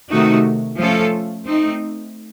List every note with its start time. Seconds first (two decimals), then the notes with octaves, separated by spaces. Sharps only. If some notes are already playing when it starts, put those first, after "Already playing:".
0.10 C3 D#3 A3 D#4 F#4
0.77 F3 A3 C#4 F4 A4
1.45 A3 C4 D#4